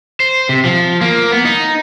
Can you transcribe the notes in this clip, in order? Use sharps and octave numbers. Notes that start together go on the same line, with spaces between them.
C5
C3
F3
A#3
B3
D#4